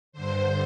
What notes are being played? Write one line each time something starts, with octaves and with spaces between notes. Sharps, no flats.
G2 D3 C5